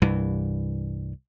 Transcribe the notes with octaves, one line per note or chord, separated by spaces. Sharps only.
C2 G2 E3